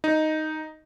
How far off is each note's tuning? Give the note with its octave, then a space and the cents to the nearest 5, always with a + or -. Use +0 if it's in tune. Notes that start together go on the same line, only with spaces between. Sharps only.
D#4 +0